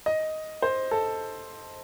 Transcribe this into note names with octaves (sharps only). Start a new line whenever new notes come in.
D#5
C5
A4